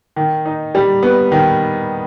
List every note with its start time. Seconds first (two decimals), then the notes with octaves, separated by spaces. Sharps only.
0.16 D#3
0.46 D#4
0.75 G3
1.03 B3
1.32 D#3